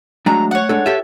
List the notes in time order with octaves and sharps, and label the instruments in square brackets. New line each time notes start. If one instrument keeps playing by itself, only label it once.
[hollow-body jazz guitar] F#3 G#3 D4 [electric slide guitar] A3 [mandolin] A#5
[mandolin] C#5 F#5
[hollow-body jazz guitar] G#3 D4 A4
[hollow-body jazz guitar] F4 G4 A4 [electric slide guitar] E5